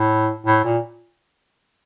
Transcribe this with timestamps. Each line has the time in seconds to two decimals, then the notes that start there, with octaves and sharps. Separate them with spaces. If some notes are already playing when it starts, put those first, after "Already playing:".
Already playing: A2
0.46 A2
0.65 A#2